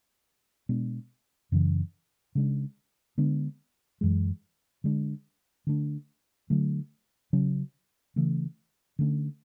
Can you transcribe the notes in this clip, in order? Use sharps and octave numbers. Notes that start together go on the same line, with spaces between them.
B2 G#3 D4
F#2 C#3 E3
C#3 G#3 D4
D3 G#3 B3 D4
F#2 E3 G#3
D3 G#3 D4
D3 A3 D4
D3 F#3 A3
C#3 F#3 C#4
C#3 E3 A3
D3 A3 C#4